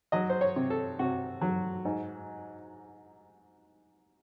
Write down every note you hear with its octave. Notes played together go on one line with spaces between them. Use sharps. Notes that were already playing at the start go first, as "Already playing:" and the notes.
F#3 D#5
C5
C#5
C3
A4
C3 F#4
F#3
G#2